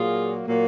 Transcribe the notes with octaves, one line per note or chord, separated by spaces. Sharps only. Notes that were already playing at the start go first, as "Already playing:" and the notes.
Already playing: A#2 F#3 A#3 F4 G#4
A#2 F#3 A#3